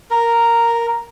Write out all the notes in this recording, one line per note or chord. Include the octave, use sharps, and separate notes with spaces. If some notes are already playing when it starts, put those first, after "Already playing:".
A#4